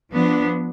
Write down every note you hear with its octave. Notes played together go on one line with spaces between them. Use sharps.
F3 B3 D4